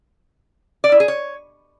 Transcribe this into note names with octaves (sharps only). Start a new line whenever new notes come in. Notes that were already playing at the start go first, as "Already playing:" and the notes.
D5
E4
G#4
C#5